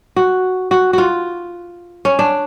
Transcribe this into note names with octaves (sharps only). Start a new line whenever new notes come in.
F#4
F#4
F4 F#4
C#4
D4